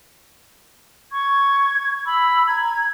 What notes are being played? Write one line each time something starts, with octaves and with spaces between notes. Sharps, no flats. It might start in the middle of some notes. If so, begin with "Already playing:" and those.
C#6 G#6
B5 E6
A#5 G#6